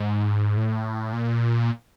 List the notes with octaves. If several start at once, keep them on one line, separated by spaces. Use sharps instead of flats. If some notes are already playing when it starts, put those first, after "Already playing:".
Already playing: G#2
A2
A#2